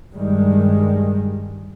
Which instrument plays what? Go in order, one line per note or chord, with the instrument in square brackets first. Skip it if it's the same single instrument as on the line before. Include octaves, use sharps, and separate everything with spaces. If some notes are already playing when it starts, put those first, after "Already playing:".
[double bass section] G2 D#3 G3 G#3